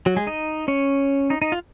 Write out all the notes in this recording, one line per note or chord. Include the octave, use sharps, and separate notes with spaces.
F#3 F#4
G#3 G#4
D#4 D#5
C#4 C#5
D#4 D#5
D#4 D#5
F4 F5